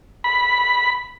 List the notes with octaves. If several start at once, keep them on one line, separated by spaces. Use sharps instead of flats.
B5